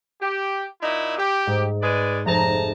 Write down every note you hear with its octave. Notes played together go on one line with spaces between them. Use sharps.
G4
A#2 D#4 E4
G4
G#2
G#3 B4 D5
F1 G#4 A5 A#5 A#6